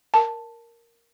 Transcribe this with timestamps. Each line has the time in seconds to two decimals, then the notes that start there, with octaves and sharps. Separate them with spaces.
0.14 A#4 A5